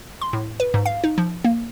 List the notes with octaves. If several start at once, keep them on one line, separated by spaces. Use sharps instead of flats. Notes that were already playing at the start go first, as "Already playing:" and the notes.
C6
A2
B4
G#2
F5
D#4
F3
A#3